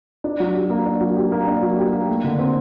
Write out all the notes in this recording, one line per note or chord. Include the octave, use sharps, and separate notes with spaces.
D4
F#3
G4
A#3
D4
F#3
G4
A#3
D4
F#3
G4
A#3
A3
D3
C4